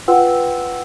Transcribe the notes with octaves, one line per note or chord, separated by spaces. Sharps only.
F4 B4 F#5 G5 C6 E6